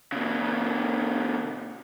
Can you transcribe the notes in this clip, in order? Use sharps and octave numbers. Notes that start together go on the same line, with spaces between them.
A#2 C#3